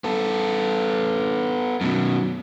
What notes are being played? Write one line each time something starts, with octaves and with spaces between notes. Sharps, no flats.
B3 A4
F#2 B2